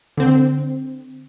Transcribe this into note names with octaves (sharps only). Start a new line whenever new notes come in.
D3 C4